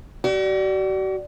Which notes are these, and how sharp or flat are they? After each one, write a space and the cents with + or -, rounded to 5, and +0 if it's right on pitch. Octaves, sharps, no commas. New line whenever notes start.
F#4 +45 D5 +0